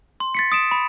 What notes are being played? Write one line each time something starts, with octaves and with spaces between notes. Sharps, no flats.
C6
A6 B6 C#7
D#6 D7 E7
B5